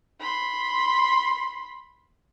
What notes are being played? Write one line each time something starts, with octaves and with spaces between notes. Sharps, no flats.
B5 C6